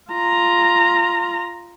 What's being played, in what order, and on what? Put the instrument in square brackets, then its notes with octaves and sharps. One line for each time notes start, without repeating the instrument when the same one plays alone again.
[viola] F4 A#5